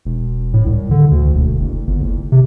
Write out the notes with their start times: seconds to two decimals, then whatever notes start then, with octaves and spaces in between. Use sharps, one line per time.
0.05 E1
0.54 A2
0.66 C2
0.91 D3
1.11 D2
1.34 E1
1.60 F#1
1.87 G1
2.02 F#1
2.32 C3